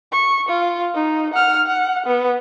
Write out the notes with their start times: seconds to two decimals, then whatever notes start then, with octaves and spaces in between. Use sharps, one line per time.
0.12 C#6
0.49 F4
0.95 D#4
1.34 F#5 F6
1.67 F#5
2.06 B3